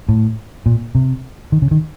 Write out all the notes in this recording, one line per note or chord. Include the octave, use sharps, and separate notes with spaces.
A2
A#2
C3
D#3
C#3
D#3